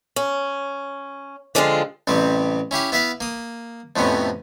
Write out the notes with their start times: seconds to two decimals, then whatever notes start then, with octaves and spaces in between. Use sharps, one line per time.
0.16 C#4
1.55 D3 F3 G#3 C4 E4 F4
2.07 A1 C3 G3 C4
2.71 C#4 E4 G4 F5
2.92 B3 E4 B4 E5 F5
3.21 A#3 D#6
3.96 F2 A2 C3 B3 C#4